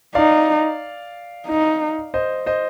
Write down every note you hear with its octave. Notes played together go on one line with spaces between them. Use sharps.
D#4 D5 F5
D#4
C5 D#5
C5 D#5